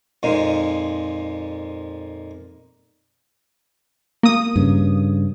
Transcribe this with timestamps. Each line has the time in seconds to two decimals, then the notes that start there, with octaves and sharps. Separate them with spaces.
0.23 F2 A#2 G#3 D#4
4.23 A#3 D#6
4.56 G2 C#3